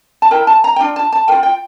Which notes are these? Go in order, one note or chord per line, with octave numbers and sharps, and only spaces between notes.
A5
E4 A#4 G5
A5
A#5
G5
D4 F4
A5
A5
F4 A#4 G5
G5